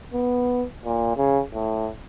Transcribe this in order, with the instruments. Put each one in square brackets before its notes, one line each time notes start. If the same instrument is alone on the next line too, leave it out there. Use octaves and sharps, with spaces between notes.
[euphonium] B3
A#2
C#3
A2